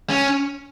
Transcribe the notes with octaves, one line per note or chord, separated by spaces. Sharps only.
C#4